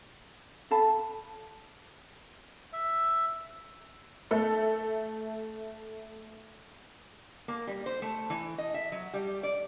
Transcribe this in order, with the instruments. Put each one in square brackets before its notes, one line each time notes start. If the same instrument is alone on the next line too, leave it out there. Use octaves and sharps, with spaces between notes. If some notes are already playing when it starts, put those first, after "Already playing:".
[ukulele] A4 F5 A5 B5
[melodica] E5
[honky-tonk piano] A3 A4
[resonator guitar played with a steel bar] A#3
G3
C5
A3
E3
D#5
E5
F#3
G3
D5